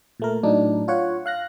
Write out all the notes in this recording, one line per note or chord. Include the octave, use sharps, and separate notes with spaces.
A#2 A3 A#4
A2 F#3 D4 D#4
F4 C#5 F#5
F5 F#6 A#6